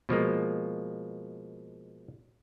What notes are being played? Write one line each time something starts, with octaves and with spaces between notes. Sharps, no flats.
B2 F3 G#3 A#3